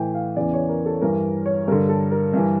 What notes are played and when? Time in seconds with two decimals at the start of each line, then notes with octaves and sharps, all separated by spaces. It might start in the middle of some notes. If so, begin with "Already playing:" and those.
Already playing: A2 E3 G5
0.14 F5
0.36 E2 C#3 E3 D5
0.53 C#5
0.69 A#4
0.86 A4
1.02 G2 E3 A#4
1.46 C#5
1.68 G2 D3 A#4
1.89 A4
2.11 A#4
2.33 G2 E3